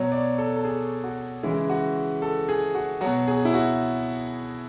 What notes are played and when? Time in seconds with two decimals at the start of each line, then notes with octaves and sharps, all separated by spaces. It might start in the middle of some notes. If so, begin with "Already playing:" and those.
Already playing: B2 F#3 C#5
0.12 D5
0.38 A4
0.57 A4
0.65 G#4
1.04 F#4
1.43 C#3 E3 G#3 E4
1.70 F#4
2.22 A4
2.49 G#4
2.75 F#4
3.01 B2 F#3 F#4
3.28 G#4
3.45 E4
3.54 F#4